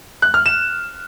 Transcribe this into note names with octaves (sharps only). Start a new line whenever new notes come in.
F#6
F6
E7